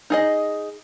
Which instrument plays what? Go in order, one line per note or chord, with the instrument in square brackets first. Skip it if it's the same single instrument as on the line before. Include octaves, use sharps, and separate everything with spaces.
[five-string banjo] D#4 G#4 D#5